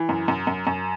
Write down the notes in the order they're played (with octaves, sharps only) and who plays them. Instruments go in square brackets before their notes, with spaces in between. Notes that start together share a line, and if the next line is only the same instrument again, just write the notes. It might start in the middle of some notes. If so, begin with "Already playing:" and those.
Already playing: [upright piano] E3
F#2
F#2
F#2
F#2